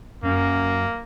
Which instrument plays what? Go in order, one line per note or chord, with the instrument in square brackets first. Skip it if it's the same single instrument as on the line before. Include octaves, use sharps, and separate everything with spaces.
[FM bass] F#2 [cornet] A#3